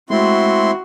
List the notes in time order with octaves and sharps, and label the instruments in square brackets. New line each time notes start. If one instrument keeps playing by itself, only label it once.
[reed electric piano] G#3 A3 [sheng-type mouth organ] C4 E4 C6 [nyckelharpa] F#4